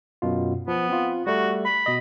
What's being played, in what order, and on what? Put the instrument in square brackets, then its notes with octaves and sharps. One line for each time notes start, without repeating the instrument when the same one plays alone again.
[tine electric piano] F#2 B2 F4
[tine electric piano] F3 [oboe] B3
[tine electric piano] C4 F4
[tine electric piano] G3 A3 [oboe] F#4
[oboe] B5
[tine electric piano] B2 D#5